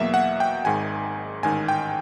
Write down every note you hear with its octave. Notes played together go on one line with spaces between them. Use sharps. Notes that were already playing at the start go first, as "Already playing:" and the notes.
Already playing: E2 B2 F#3 A#3 E5
F#5
G5
G#1 G#2 D#3 G#5
A1 G#2 D#3 G#5
G5